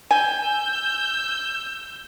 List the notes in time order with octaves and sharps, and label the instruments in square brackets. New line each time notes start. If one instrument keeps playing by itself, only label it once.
[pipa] G#5 [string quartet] E6 G6